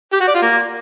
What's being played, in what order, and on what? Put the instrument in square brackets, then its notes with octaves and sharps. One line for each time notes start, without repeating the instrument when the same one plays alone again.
[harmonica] G4
F#4
D5
F4
A#3